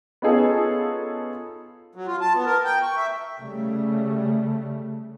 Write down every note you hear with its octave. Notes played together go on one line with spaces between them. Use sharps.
B3 C#4 D#4 F4 G#4 A4
F#3
F4
A5
B3
A#4
G5
C#6
E5
C#3 G3 A3